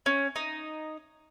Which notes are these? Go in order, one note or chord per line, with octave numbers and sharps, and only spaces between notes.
C#4
D#4